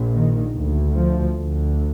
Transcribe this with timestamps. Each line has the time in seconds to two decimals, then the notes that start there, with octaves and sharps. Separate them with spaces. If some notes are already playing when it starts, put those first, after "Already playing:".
Already playing: A#1 A#2
0.13 D#3
0.55 D2
0.95 F3
1.37 D2